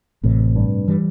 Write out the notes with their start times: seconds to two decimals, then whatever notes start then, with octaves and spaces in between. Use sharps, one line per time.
0.23 A1 A2 C3
0.56 G2
0.88 E3 G3